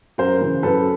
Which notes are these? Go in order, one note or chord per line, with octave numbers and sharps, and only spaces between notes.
F#2 A#4 C5
C#3 E3
F#2 A4 B4